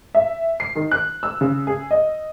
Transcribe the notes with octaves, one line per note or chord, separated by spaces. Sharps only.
E5
C7
D#3
F#6
E6
C#3
G#4
D#5